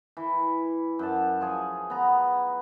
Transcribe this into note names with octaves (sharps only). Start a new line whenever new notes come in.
E3
F#2 A5
F3 G#4
B3 A#5